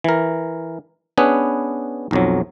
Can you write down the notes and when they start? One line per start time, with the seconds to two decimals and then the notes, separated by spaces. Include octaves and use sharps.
0.04 E3 A#4
1.18 B3 C#4 D4 G#4 B4
2.11 B1 F2 F#3